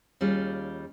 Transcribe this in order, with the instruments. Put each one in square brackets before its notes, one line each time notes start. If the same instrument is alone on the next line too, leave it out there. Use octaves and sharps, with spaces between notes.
[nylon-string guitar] D#2 G3 C#4 F4 G#4